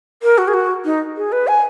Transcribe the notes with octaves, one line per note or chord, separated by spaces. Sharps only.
A#4
F#4
G#4
F#4
D#4
G#4
B4
G#5